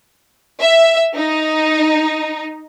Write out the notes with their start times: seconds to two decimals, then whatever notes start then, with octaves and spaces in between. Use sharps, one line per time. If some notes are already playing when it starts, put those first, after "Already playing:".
0.61 E5
1.16 D#4